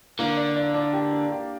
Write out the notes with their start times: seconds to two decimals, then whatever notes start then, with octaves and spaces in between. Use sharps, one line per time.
0.19 D3 A#3
0.37 D5
0.56 D5
0.74 D4
0.93 G4
1.12 D4
1.31 G4